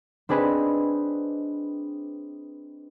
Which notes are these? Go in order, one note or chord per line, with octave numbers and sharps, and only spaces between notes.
C4 D4 G#4 B4 D#5